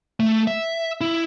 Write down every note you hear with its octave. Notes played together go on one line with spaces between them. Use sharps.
A3
E5
E4